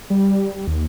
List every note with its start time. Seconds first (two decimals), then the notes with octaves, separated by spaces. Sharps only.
0.10 G3
0.67 D#2